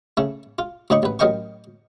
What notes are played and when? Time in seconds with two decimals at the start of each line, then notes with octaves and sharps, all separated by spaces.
0.17 C#3 A3
0.59 F4
0.90 D2 A2 D#4 B5 C#6
1.03 A1 B4
1.19 A1 F#3 A#4 D#5 G5 C#6